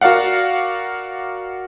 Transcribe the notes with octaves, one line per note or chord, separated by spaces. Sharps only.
F#4 A#4 D5 F5 F#5